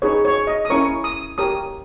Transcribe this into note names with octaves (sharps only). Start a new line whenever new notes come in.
D#4 G#4 B4 C#5
C#5
D#5
D#6
C#4 E4 A#4 C#5 C#6
D#6
G4 A#4 C#5 D#6